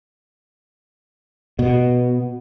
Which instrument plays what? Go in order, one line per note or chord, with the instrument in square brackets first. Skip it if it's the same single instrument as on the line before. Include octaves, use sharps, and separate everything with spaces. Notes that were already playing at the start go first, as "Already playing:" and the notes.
[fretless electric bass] B2